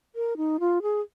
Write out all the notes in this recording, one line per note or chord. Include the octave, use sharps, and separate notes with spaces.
A#4
D#4
F4
G#4